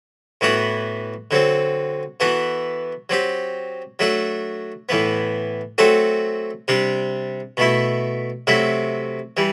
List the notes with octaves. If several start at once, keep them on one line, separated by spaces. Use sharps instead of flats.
A2 E3 B3 F#4
D3 F#3 C4
E3 B3 F#4 A4
F#3 C4 G4
F#3 A3 D4 A4
A2 E3 B3
F#3 A3 C4 F#4 A4
C3 G3 D4
B2 A3 E4
C3 F#3 A3 E4
E3 G3